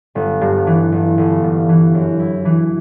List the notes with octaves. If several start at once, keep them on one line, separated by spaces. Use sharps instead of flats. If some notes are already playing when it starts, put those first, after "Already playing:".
G1
G2
E3
G1
G1
G2
E3
F#2
E4
E3